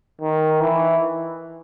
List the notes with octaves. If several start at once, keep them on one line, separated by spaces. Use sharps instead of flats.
D#3
E3